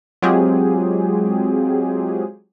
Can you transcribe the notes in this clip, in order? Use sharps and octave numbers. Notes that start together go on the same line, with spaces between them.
F#3 G#3 C4 F4 G4 G#4